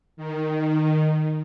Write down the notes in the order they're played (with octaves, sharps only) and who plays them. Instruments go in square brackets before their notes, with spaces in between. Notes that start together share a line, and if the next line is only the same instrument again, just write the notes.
[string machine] D#3